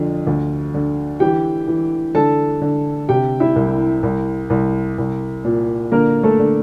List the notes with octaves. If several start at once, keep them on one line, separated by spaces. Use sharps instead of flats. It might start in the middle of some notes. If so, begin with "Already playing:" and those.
Already playing: F2 D3 F4
D2
D3
E3 G4 G5
E3
D3 A4 A5
D3
C3 G4 G5
E4 E5
C2
C2
C2
C2
A#2
D3 A#3 A#4
A3 A4
D3